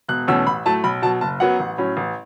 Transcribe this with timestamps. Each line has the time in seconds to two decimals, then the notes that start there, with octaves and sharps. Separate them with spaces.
0.08 E1 F#6
0.27 E2 B2 A3 C#4 E6
0.47 A1 B5
0.65 A2 F#3 A3 A5
0.84 B1 B5
1.02 B2 F#3 A5
1.21 F#1 A5
1.40 F#2 F#3 B3 F#5
1.60 A1
1.78 A2 F#3 C#4
1.97 A1